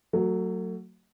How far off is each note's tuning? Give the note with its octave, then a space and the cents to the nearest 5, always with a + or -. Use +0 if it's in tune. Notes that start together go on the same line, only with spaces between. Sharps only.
F#3 +0 A3 +35